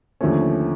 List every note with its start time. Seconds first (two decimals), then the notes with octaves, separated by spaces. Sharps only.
0.21 D#2 D3 F3 A3 C#4